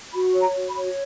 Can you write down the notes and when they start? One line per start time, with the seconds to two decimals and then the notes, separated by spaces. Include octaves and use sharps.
0.14 F#4 B5
0.34 C#5
0.41 A#5
0.55 F#4
0.69 B5
0.75 C#5